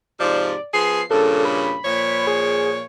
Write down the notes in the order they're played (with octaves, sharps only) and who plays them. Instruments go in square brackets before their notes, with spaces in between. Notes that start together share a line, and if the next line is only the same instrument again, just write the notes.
[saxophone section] G#2 C3 F3 [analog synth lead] D5
[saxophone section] F3 B3 G#4 [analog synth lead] C7
[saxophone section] G2 A#2 C#3 [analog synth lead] A4
[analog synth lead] B5
[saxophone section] A#2 F3 C#5
[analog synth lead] G#4